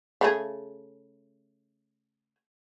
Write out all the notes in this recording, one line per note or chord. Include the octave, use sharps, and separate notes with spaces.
C#3 A3 G#4